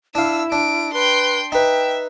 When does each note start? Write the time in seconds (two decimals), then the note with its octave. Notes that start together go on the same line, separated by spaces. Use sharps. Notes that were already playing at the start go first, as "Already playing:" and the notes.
0.15 D4 E4 F5 E6
0.52 D4 D7
0.93 B4 G5 C6
1.52 D#4 B4 E5 G5